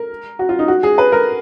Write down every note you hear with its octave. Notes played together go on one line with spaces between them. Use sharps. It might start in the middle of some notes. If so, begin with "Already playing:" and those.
Already playing: A#4
F#4
F4
D#4
F#4
G#4
B4
A#4